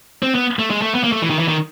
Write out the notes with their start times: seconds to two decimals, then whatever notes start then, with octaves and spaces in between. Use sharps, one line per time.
0.23 C4
0.35 B3
0.59 A3
0.70 G#3
0.82 A3
0.95 B3
1.04 A#3
1.12 A3
1.22 E3
1.30 D#3
1.39 E3
1.48 D#3